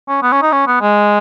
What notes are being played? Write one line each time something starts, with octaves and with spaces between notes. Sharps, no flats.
C#4
B3
C#4
D#4
C#4
B3
G#3